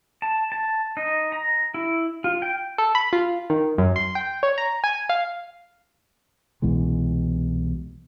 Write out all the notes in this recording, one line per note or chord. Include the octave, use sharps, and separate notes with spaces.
A5
A5
D#4
A#5
E4
F4
G5
A4
B5
F4
D#3
F#2
C6
G5
C#5
A#5
G#5
F5
C2 B2 E3 G#3